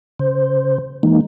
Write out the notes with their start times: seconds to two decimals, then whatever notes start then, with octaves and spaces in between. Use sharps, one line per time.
0.19 C#3 C5
1.03 E3 G#3 A#3 D#4